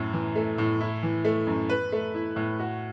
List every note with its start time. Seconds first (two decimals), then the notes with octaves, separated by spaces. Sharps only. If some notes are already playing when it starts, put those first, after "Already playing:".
Already playing: F#2 A2
0.13 E3
0.36 A3
0.58 A2
0.81 E4
1.03 E3
1.25 A3
1.47 F#2
1.69 B4
1.92 A3
2.14 E4
2.36 A2
2.59 F#4